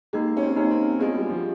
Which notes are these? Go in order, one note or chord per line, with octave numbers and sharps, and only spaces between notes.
G#3 A#3 D#4 G4
C#4
C4
A#3 C#4 D#4 G4
C4
G#3 B3 D4 F4 G#4
G3
F3